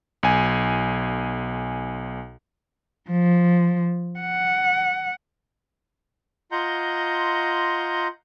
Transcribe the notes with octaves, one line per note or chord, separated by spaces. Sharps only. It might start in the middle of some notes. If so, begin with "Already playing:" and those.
B1 G#5
F3
F#5
F4 D#5 F#5 A#5 C6 G6